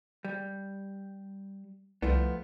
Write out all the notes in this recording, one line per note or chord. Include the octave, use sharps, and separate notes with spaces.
G3
C2 F3 A3 B3